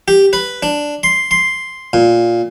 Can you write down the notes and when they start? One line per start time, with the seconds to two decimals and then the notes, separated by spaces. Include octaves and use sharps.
0.08 G4
0.33 B4
0.63 D4
1.03 C6
1.31 C6
1.93 A#2